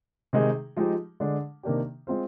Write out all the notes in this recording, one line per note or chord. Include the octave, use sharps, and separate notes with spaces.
C3 D#3 G#3 D#4 G#4
F3 G#3 D#4 G4
D3 G#3 D4
C3 D#3 A#3 D4 G4
G#3 C4 F4 C5